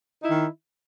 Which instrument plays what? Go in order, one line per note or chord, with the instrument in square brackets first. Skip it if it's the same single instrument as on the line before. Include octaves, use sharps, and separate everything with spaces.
[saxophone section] D#4
E4
D#3